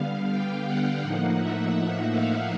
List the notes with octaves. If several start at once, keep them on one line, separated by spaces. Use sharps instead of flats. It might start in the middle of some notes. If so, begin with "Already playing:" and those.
Already playing: D3 G3 B3 F5
G5
F#5
A2 F3 A#3 D#4
E5
F5